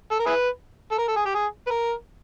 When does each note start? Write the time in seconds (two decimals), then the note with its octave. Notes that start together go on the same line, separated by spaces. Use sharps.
0.11 A4
0.19 A#4
0.26 E4 G#4 B4
0.91 A4
0.98 A#4
1.08 A4
1.16 G#4
1.26 G4
1.34 G#4
1.67 B4
1.70 A#4